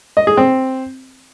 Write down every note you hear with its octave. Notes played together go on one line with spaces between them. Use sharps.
D#5
G#4
C4